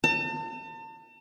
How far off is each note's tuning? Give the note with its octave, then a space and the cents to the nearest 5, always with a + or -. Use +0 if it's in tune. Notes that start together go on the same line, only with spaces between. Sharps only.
A5 +40